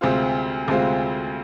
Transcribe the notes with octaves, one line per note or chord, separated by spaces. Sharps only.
D2 C3 G#3 C4 F4
D2 C3 G#3 C4 F4